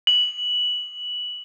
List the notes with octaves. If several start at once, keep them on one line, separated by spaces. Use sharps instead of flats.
F#7